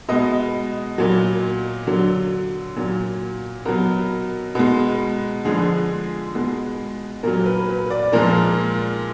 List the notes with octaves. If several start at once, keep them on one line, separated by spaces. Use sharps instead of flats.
B2 G#3 D#5
A#2 F#3
D3 F#3
A#2 F#3
B2 F#3 A#4
B2 G#3
D3 F3 G#3 G#4
B2 G#3
A#2 F#3 A#4
B4
B4
D5
A#2 F3 G#3 A#4